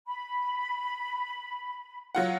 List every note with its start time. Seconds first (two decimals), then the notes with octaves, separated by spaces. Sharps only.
0.06 B5
2.15 F#3 F4 F#5